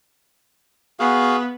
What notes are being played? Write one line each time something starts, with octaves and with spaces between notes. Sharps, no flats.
B3 F#4 G#4 F5